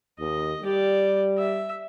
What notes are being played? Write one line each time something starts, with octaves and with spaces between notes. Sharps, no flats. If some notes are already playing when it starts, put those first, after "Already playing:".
D#2 D#5
G3 G4 D5
E5